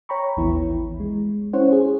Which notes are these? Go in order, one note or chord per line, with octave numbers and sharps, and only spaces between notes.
C#5 G5 A#5 B5 C#6
A1 D#2 E3 B3 E4
G#3
C#4 E4 C5 C#5 F#5
G#4